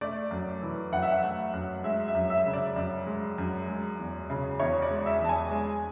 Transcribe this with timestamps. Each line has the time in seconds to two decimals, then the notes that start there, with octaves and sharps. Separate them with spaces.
0.01 A3 D5
0.31 F#2
0.62 E3
0.92 F#2 F#5
1.02 E5
1.11 F#5
1.24 A3
1.53 F#2
1.84 G#3 E5
2.08 E5
2.15 F#2
2.30 E5
2.46 C#3
2.53 D5
2.76 F#2
3.06 G#3
3.38 F#2
3.68 G#3
3.98 E2
4.30 C#3
4.60 E2 C#5
4.82 D5
4.91 G#3
5.06 E5
5.21 E2 A5
5.29 G#5
5.51 G#3